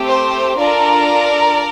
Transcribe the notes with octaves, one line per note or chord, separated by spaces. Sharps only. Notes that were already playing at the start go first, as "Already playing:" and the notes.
Already playing: A3 C4 G4
C5
D4 F4 A4 A#4 D5